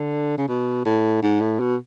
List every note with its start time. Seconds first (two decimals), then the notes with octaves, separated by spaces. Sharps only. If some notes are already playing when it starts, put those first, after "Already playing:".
Already playing: D3
0.37 C#3
0.48 B2
0.85 A2
1.22 G#2
1.41 A2
1.59 B2